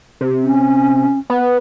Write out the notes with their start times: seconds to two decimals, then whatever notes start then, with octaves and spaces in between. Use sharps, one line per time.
0.21 C3
0.43 C#4
1.30 B3